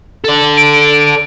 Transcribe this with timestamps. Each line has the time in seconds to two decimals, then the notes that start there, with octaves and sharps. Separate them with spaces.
0.25 A4 D5
0.57 D7